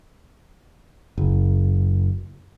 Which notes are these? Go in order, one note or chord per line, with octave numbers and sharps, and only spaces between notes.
F#1